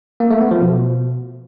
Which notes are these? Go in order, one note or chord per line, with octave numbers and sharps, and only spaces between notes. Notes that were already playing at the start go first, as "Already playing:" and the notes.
A#3
A3
B3
F3
B2